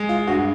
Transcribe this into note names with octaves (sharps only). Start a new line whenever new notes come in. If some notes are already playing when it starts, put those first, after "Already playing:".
Already playing: G#3
F4
G2 F#4